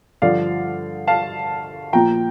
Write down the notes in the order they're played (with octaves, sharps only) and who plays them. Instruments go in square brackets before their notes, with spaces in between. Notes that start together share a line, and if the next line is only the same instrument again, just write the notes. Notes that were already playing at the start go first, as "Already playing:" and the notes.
[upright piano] G2 D3 F3 D5 F5
F5 A5
A#2 F3 G5 A#5